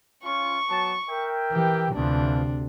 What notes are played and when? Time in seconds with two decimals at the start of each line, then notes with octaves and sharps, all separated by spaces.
0.24 C#4 F4 C#6
0.68 F#3 B3 A5
1.08 A#4 E5 G5
1.52 E3 G4
1.95 D2 C3 E3 F3 D4